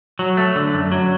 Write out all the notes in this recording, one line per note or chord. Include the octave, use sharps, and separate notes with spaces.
F#3
A3
D3
F#2
F#3